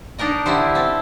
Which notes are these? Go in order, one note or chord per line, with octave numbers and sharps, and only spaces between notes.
D4 D#4 A#4 D#5
D3 E4 G4 C5
C4 A4